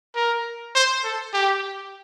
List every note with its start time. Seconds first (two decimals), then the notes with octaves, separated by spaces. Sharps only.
0.15 A#4
0.75 C5
1.04 A4
1.33 G4